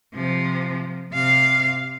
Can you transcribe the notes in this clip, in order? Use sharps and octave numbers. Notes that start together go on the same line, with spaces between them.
C3 F3
C3 F5